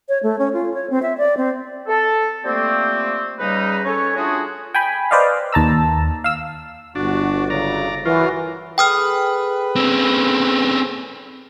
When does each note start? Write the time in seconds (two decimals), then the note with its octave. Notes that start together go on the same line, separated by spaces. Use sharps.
0.09 C#5
0.23 A3
0.39 C#4
0.53 F4
0.74 C#5
0.90 C4
1.02 E5
1.18 D5
1.37 C4
1.88 A4
2.45 F3 G3 A3 A#3 C4
3.39 C#3 G3 D#4 B4
3.86 C#4 A4 C#5
4.16 A3 C#4 D4 F4 F#4 G#4
4.74 G5 G#5 B5
5.11 B4 C5 D5 D#5 F5
5.53 D#2 A5 A#5 E6
6.24 F5 E6
6.95 G1 D4 F#4
7.50 C#3 F#3 D5 A#5
8.05 E3 F#3 F4 F#4 A#4
8.78 G#4 A4 B4 G5 D#6 F6
9.76 C4 C#4